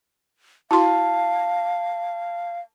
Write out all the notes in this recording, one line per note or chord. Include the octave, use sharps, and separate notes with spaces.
E4 F#4 F5 A5 C6